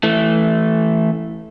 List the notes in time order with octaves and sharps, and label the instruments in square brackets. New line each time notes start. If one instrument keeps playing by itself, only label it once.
[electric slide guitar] E3 A3